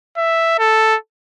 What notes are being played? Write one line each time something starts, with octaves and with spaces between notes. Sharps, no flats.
E5
A4